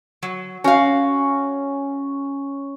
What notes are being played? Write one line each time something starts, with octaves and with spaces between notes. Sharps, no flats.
F#3
C#4 F#4 F5